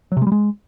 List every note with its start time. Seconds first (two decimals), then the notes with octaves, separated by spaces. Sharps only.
0.12 F#3
0.17 C3
0.22 G#3
0.27 G3
0.32 G#3